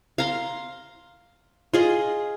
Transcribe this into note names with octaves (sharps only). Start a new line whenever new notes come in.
F5 A#5 C6
F4 G#4 D#5